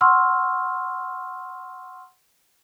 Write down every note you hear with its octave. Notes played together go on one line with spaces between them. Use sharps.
F#5 C6 C#6 E6 F6